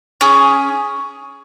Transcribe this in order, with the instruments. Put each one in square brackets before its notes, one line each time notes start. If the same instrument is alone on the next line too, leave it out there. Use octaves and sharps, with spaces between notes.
[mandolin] C#4 G#4